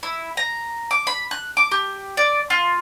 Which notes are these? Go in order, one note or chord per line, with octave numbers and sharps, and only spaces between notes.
E4
A#5
D6
B5
F#6
D6
G4
D5
F4